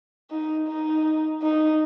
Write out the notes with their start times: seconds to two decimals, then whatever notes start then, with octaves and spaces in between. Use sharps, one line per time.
0.31 D#4
0.68 D#4
1.42 D#4